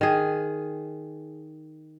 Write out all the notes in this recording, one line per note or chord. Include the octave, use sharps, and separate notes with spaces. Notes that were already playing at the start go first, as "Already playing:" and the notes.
D#3 G#4